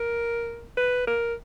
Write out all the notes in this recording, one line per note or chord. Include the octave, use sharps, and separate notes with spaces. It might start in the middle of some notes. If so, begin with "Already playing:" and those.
Already playing: A#4
B4
A#4